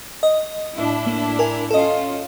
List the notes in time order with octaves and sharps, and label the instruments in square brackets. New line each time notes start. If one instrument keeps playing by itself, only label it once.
[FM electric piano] D#5
[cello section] A2 D4 E4
[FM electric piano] A#3
A#4 G#5
[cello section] C#4 F4 [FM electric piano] A4 D#5